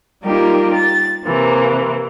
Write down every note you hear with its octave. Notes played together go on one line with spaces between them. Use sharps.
G3 A#3 D#4 F4 G4 A#4
A6
C3 E3 A#3 C4